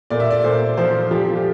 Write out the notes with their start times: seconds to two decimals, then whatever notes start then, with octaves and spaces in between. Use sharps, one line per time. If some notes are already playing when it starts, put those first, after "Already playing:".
0.10 A#2 D5
0.20 E5
0.31 D5
0.44 A#2 C5
0.77 F3 C5
1.11 F3 G4
1.36 G4